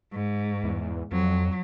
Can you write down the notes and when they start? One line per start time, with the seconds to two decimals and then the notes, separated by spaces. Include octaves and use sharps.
0.13 G#2
0.64 E2
1.12 F2 F#3